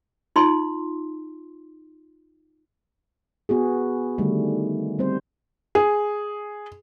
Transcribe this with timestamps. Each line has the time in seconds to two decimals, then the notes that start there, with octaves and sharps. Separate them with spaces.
0.36 D#4 F4 C6
3.49 B3 F#4 G#4
4.18 D3 D#3 G3 A3
4.99 G3 C4 C5
5.75 G#4